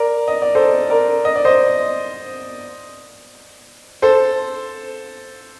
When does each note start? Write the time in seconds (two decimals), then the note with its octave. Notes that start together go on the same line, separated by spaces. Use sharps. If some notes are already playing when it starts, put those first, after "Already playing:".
Already playing: A#4 D5
0.28 D#5
0.42 D5
0.55 A4 C5
0.90 A#4 D5
1.25 D#5
1.36 D5
1.45 C5 D#5
4.02 A4 C5